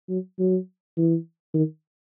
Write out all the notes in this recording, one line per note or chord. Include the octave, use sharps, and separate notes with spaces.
F#3
F#3
E3
D#3